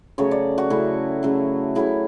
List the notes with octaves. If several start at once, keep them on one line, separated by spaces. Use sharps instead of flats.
C#3 F#3 A3 C#5
D5
F#4
C#3 F#3 A3 E4
C#3 F#3 A3
C#3 F#3 A3 E4